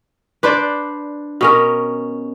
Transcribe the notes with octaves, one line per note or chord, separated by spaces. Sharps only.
D4 B4 C5 D5
B2 C#4 A#4